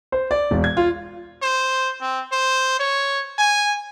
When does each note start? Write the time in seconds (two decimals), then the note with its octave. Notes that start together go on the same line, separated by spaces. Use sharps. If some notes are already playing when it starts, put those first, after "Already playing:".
0.12 C5
0.31 D5
0.51 E1
0.64 G#6
0.77 F4
1.42 C5
2.01 C4
2.32 C5
2.79 C#5
3.38 G#5